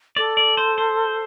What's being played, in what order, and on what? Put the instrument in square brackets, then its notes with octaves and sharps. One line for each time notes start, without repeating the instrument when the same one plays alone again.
[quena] A4 [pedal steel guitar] D5
[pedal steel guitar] D5
C5
C5